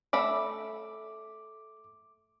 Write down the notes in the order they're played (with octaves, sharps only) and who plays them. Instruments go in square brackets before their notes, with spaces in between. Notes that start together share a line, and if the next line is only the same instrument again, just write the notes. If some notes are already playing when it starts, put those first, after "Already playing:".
[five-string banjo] A3 E5 B5 [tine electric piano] D6